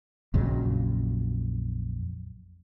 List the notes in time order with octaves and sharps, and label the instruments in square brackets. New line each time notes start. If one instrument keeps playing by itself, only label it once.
[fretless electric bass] A#1 F2 C#3 F#3